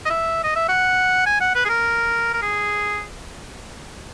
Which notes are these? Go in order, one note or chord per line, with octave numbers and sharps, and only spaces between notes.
D#5
E5
D#5
E5
F#5
G#5
F#5
B4
G#4
A#4
A#4
G#4